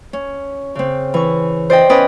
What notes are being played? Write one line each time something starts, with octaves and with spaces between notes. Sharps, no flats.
C#4
C#3 C4
E3 C#6
C5 D5 D#5 G5
B3 C#4 B4 D5 D#5 D#6